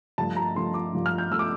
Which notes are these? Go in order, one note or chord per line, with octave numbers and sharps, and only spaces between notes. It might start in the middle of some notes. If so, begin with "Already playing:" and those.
G2 F3 A3 A5
A#5
G2 F3 A3 C6
D6
G2 F3 A3
F6
G6
F3 A3 E6
D6